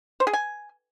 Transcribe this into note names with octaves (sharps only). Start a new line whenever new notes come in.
C5
G#4
G#5